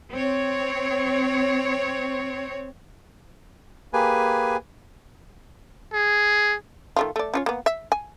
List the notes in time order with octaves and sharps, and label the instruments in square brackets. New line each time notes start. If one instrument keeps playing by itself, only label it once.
[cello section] C4 C#5
[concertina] A#3 G4 G#4 B4 G#5
[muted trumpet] G#4
[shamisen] D#3 A3 F4
A3 D5
C#4 F4 C#5
A#3 B3
E5
G#5